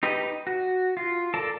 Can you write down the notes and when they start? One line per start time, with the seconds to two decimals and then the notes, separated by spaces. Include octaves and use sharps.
0.03 D#4 G4 B4 D#5
0.47 F#4
0.97 F4
1.34 A4 A#4 D5 A5